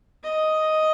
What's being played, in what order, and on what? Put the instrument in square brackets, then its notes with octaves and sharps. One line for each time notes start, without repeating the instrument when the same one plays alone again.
[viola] D#5